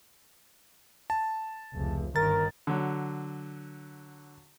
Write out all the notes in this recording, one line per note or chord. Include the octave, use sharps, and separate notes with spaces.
A5
F1 C#2
G1 D#3 A#4 A6
D3 F#3